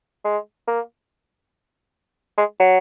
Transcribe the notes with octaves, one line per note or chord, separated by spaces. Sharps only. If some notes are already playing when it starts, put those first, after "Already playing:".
G#3
A#3
G#3
F#3